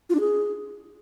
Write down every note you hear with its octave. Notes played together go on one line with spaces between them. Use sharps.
F4
D4
G#4